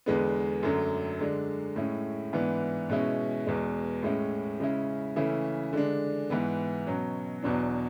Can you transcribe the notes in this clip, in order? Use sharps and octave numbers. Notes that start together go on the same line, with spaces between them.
E2 D3 G#3 B3
F#2 D3 F#3 A3
D3 G#3 D4
A2 G#3 C#4 E4
G#2 E3 B3 D4
B2 G#3 C#4 E4
E2 B2 G#3
A2 G#3 C#4 E4
C#3 G#3 C#4 E4
C#3 E3 A3 C#4 E4
D3 G#3 D4
G#2 E3 B3
B2 F#3 C#4
E2 B2 F#3 B3 D4